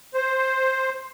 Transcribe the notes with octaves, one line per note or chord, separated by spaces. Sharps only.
C5